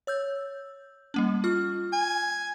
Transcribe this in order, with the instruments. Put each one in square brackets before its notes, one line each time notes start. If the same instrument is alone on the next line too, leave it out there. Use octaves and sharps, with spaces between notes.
[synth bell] C#5 E6 G6
G3 A#3 C#4
F4 F6
[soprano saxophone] G#5